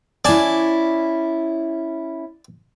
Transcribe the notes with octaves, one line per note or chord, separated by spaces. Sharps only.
C#4 E4 D5 G#5 A5